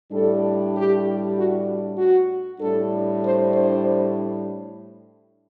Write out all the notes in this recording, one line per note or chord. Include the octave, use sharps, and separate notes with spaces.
A2 G3 D4 A4
G4
F#4
F#4
A2 G3 D4 A4
C5
C5